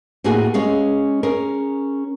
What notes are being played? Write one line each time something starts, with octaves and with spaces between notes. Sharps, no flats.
A2 A3 A#3 F#4 G#4 G#5
G#3 C#4 G#4 F5
C#4 G#4 A#4